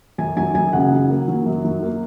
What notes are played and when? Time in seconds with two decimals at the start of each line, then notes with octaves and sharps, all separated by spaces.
0.18 F#2 G#5
0.37 F#3 G#5
0.55 F#2 G#5
0.73 C#3 F#5
0.92 F#3
1.10 A#3
1.28 F#3
1.46 F#2
1.65 F#3
1.83 A#3